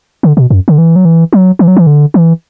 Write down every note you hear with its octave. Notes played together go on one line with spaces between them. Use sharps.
D3
B2
F#2
D3
E3
F#3
E3
F#3
E3
F#3
E3
D3
E3